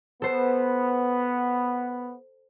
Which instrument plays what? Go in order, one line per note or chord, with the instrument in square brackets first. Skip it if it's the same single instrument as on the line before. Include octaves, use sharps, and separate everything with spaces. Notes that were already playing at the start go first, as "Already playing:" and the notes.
[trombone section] B3 [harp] A4 C5